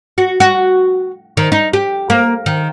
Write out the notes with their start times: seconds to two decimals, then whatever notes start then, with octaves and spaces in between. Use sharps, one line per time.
0.18 F#4
0.40 F#4
1.37 D#3
1.52 D#4
1.73 G4
2.10 A#3
2.46 D#3